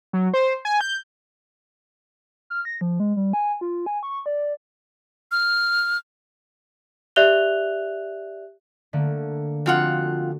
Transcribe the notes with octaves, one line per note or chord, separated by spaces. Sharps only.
F#3
C5
G#5
G6
F6
A#6
F3
G#3
G3
G#5
F4
G#5
C#6
D5
F6
G4 D5 E5 F#6 F7 G7
D3 A3 A#3
F2 F4 F#4 F#5